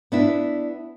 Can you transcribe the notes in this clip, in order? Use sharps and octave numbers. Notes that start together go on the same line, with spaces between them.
B3 D4 E4